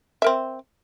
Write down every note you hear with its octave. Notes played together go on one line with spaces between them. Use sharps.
C4 A#4 E5